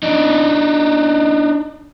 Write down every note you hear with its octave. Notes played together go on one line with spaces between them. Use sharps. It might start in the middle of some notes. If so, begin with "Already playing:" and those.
D4 D#4